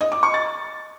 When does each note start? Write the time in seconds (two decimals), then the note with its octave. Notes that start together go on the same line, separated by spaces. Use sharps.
0.01 D#5
0.12 D6
0.23 C#6
0.34 A6